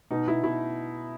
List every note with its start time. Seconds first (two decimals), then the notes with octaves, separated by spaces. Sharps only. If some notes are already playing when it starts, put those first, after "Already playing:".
0.11 B2 D#4
0.28 B2 E4
0.44 B2 E4